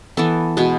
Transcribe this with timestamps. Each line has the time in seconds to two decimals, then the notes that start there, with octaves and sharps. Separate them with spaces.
0.17 E3 B3 A4
0.57 B2 G#3 B3